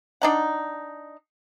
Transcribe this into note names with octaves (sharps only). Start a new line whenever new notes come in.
D4 D#4 F#5